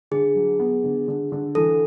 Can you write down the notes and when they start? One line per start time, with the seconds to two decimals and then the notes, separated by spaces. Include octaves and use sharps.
0.11 D3 G#4
0.35 F#3
0.59 B3
0.84 D3
1.08 D3
1.32 D3
1.55 E3 A4